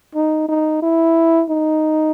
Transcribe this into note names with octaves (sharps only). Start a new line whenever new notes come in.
D#4
D#4
E4
D#4